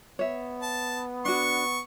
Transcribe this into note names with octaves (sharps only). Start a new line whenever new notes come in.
B3 C#5 E5
A5
D4 F#4 C#6